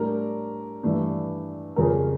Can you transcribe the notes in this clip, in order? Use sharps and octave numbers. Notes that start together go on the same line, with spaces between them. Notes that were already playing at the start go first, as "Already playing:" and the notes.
Already playing: A2 G3 D4 A#4
G2 E3 A3 D4
F2 C#3 G3 C#4 A#4